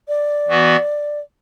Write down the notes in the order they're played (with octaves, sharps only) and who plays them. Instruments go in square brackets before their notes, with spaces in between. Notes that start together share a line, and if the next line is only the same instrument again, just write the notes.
[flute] D5
[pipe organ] E3 B3 F#4